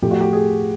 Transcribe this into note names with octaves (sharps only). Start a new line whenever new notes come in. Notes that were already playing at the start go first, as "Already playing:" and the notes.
A2 F3 A3 G4
F#4
G4
G#4